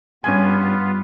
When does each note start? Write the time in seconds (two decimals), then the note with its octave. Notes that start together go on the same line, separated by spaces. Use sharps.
0.24 G2 G3 B3 C#4 F4 G#5